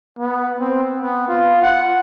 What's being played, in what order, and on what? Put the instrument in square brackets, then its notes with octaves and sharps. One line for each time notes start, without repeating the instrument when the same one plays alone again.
[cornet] B3
C4
B3
F4
F#5